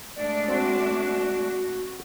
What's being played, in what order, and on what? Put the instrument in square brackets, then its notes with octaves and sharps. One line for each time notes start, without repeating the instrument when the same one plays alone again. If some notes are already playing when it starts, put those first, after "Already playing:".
[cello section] G#3 A3 D4 [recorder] D5
[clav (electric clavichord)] C4 [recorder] F#4